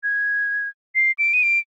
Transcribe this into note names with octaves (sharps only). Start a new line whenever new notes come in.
G#6
C7
D7
D#7
D7